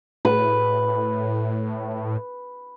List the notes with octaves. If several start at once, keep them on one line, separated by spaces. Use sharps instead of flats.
A2 B4